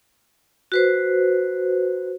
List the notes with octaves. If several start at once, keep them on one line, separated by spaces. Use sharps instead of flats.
F#4 B4 C5